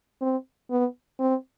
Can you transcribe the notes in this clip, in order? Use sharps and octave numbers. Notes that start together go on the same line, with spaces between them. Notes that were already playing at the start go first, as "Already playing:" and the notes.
C4
B3
C4